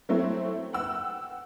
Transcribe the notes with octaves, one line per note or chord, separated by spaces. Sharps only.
F#3 A3 C4 E4
F#5 G5 E6